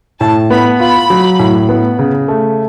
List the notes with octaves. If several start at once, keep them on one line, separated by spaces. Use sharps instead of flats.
A2 A5
B3 B5
F4 B5
F#3
A2
B3
C#3
A3